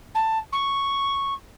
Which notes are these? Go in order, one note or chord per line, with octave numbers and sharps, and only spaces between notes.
A5
C#6